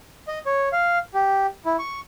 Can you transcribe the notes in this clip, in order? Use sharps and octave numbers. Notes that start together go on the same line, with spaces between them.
D#5
C#5
F5
G4
E4
C#6